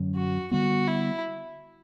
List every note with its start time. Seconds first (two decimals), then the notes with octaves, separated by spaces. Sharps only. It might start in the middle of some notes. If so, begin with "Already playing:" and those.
Already playing: F#2 D3 F#3 C#4
0.15 F#4
0.51 D3 G3 B3 F#4
0.88 E4